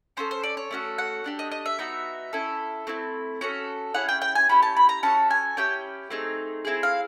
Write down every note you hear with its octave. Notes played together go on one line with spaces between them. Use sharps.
C#4 E4 A4 C5
C5
D5
C#5
A3 C#4 F#4 A4
F#5
A3 D4 G4
D#5
D#5
E5
B3 D#4 F#4
C#4 E4 A4
A3 C4 E4
C#4 F#4 A4
C#4 E4 G#4 F#5
G5
G5
G#5
C#4 E4 G4 B5
A5
B5
A#5
C#4 F#4 A4 A5
G#5
C#4 E4 G4 G5
A3 C4 D#4 G#4
C4 E4 G#4
F5